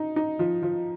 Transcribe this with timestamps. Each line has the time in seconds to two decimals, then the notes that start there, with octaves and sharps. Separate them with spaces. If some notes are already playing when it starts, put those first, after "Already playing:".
Already playing: D#4
0.16 D#4
0.39 F3
0.62 F3